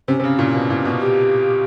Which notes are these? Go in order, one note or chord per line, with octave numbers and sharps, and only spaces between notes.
C3 C#4
C3
C#3
A#2
B2
A#2
B2
G4